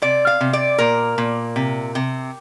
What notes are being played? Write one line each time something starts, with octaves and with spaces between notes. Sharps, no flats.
C3 D5
F5
C3
D5
A#2 A#4
A#2
C3
C3